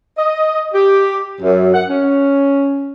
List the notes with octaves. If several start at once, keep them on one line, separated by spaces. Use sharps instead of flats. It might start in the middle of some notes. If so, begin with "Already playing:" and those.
D#5
G4
F#2
F#5
C#4